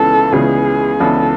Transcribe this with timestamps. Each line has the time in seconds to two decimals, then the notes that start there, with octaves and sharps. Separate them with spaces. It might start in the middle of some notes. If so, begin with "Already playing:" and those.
Already playing: C#2 C#3 E3 B3 A4
0.32 C#2 C#3 E3 B3 G#4
1.00 C#2 C#3 E3 B3 A4